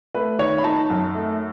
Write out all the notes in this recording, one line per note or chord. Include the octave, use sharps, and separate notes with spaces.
A3 B4
D#3 C#5
B5
D#4 A5
F#2
A3